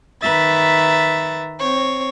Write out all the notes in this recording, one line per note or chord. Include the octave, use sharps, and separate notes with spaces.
D#3 B4 E5 A#5 A6
C4 C#5